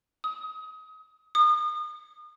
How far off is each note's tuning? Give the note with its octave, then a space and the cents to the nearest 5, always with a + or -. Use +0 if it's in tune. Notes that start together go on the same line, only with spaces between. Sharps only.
D#6 +30
D#6 -35